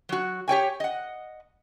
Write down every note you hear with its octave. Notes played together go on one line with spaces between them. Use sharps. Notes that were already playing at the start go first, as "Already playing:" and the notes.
F#3 F#4
G4 C#5 G5 G#5
D#5 F#5